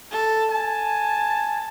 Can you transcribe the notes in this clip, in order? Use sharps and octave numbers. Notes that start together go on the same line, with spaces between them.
A4
G#5 A5